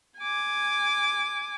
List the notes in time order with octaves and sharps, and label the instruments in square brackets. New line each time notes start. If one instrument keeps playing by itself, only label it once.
[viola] G#5 D6